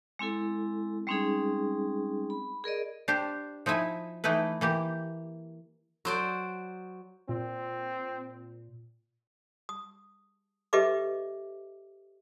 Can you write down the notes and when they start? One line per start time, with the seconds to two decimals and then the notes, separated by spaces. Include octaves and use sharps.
0.19 G#3 C4 E4 A4
1.07 G3 G#3 C4 C#4 D#4 G#4
2.30 B5
2.64 G#4 A#4 D5 D#5
3.08 D4 G4 C5
3.66 F3 D#4 E4 E5 G#5
4.24 E3 A3 D#4 E4 B4
4.61 E3 A#3 G4
6.05 F#3 C5 D5
7.29 A#2 C4
9.69 D#6
10.73 G4 A4 B4 D#5 E5 D6